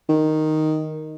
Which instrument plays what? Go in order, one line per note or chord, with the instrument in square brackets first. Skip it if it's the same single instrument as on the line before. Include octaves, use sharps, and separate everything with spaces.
[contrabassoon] D#3